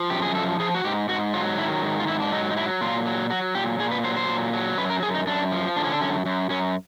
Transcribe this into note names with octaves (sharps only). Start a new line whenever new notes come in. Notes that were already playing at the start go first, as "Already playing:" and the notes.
Already playing: F3
F#2 G4
G#4
F3 A4
F3 G#4
F#4
G#2 G4
G#2 F#4
F#3 F4
D#3 E4
G#2
F4
G#2 E4
D4
F#3 D#4
D#4
F#3 E4
A#2 F4
F#3
F#3 F#4
A#2 G4
A#2 G#4
B4
F#3 C5
C5
A#2
F#3
F#2 B4
A#4
F#2 G#4
D#4
F#2 D4
F3
D3 D4
C#4
D4
F#2 C#4
F#2
F#2 C#4